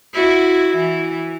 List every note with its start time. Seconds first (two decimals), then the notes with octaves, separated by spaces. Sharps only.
0.13 E4 F#4
0.75 E3